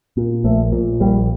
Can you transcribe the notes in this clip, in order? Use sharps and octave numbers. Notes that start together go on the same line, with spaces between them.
A#2
A#1 A3
A#2
A#1 G3